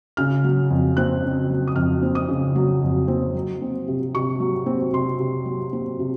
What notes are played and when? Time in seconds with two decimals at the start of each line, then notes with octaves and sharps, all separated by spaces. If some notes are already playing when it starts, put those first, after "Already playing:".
0.17 C#3 F6
0.44 F#3
0.71 F2
0.97 C4 F#6
1.23 C#3
1.50 F#3
1.68 D#6
1.76 F2 F6
2.03 C4
2.15 D#6
2.28 C#3
2.56 F#3
2.83 F2
3.08 C4
3.35 F#3
3.62 C4
3.88 C3
4.15 C3 C#6
4.40 F#3
4.66 C4
4.93 C3 C6
5.19 C3
5.46 F#3
5.73 C4
5.99 C3